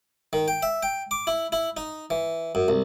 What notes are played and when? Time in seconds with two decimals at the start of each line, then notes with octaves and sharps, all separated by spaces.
0.33 D#3
0.48 G5
0.63 E5
0.83 G5
1.11 D6
1.27 E4
1.52 E4
1.77 D#4
2.10 E3
2.55 F#2
2.68 C2